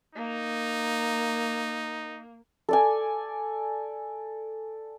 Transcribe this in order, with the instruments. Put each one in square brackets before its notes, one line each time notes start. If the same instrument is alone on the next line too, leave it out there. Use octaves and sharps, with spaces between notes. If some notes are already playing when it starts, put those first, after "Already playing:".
[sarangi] A#3 [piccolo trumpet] D#4
[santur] A4 D5 G#5